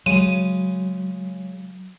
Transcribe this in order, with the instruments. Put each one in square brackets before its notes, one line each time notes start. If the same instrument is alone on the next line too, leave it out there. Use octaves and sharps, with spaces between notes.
[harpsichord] C#3 G#3 [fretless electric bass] F#3 [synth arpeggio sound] D#7